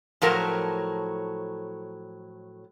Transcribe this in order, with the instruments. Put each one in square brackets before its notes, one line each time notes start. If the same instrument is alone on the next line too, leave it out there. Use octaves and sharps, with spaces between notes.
[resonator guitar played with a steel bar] A2 F3 F#3 A#4 A5